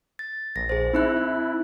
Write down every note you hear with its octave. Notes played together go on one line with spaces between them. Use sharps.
A6
A#1 A#6
G#4 C5
C4 D#4 E4 F#6